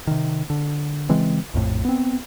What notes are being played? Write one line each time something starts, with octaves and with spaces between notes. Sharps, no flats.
C3 D#3
D3
C#3 E3 G#3 C4
A#1 F2 A2
B3 C4